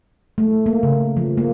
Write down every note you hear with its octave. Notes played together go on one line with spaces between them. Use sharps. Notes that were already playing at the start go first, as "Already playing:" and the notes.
A3
A#3
C#3
F3
A#3